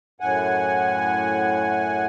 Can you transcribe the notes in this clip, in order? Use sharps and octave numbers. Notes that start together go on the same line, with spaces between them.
F#2 A2 F#5 G#5